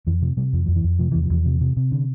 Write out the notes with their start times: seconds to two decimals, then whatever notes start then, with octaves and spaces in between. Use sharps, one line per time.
0.07 F2 E3
0.22 C3 F3
0.37 C3 G3
0.53 F2 F3
0.66 F2 F3
0.76 E3
0.84 F2
0.99 C3 F3
1.11 E2 E3
1.23 F3
1.30 E2
1.46 C3
1.61 C3
1.77 C3
1.92 D3